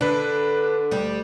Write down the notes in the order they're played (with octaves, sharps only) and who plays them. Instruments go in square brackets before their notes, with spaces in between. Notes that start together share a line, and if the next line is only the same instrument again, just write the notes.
[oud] D3 [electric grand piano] D4 B4
[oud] D2 G3